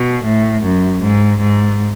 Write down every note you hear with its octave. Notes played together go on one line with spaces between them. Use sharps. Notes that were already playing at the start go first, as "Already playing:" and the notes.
Already playing: B2
A2
F#2
G#2
G#2